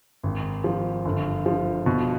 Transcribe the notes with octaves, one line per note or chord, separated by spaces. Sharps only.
G#1
F3
G1
F3
B2